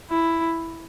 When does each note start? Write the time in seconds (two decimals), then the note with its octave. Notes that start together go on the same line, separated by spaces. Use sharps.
0.10 E4